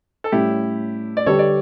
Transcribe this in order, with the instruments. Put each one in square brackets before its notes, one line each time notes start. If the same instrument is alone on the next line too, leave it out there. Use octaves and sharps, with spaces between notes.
[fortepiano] A4
[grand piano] A2 G3 C#4 [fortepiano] E4 G4
[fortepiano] D5
[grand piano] D3 G3 D4 G4 B4 [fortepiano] A4 C#5
[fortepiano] D5